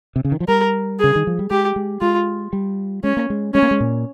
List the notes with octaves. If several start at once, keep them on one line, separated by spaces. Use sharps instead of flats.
C3
C#3
D#3
F3
G3 A#4
C#3 G#4
D#3
F3
G3
G#3 G4
G#3
G#3 F4
G3
G#3 C#4
A#3
G#3
G#3 C#4
A#3
G#3
A#2